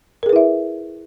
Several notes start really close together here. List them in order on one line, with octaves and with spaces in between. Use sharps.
A#4 G#4 B4 E4 E5